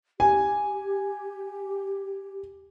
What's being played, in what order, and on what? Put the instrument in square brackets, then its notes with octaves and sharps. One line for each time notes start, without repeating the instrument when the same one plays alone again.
[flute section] G4 [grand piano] G#5